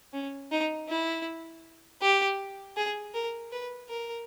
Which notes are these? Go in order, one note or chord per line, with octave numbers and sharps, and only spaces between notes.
C#4
D#4
E4
G4
G#4
A#4
B4
A#4